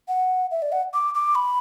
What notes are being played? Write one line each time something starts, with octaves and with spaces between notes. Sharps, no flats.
F#5
E5
D5
F#5
D6
D6
B5